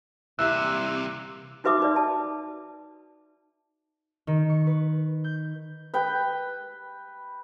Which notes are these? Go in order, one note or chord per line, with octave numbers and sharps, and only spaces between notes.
C2 C3 E3 A#3 G4 E6 F#6
D#4 F#4 B4 E5 D6 D#6
D#4 B4 D5
A5
D#3
C#6
B4
G6
B4 G5